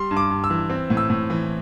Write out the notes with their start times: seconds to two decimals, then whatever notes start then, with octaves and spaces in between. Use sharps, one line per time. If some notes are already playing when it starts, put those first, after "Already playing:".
Already playing: G3 C6
0.11 G2
0.17 D6
0.30 G2
0.44 E6
0.50 E3
0.70 C4
0.90 A2
0.97 E6
1.10 A2
1.30 E3